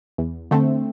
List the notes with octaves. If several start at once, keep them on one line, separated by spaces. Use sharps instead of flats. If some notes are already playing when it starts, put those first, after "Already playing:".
E2
D3 A3 C4